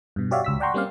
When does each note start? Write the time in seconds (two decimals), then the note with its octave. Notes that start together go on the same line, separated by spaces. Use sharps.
0.16 G2 B2
0.31 F#4 G4 C#5 D5 E5 F5
0.44 C#2 E6 B6
0.60 D5 F#5 G5 A#5 C6 C#6
0.74 G3 A#3 C4 C#4 D5 F5